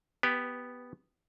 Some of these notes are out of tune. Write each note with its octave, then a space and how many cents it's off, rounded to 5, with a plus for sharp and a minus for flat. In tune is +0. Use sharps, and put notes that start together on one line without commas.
B3 +0 G4 +0 B4 +30